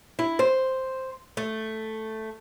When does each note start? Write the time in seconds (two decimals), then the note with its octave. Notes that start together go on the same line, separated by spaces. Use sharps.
0.19 E4
0.39 C5
1.37 A3